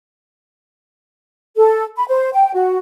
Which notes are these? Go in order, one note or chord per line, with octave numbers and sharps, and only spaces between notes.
A4
B5
C5
G5
F#4